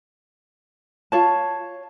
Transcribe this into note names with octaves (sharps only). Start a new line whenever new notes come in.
F4 C#5 A5